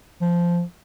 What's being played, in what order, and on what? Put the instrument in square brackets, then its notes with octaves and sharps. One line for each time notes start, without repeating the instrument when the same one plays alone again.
[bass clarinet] F3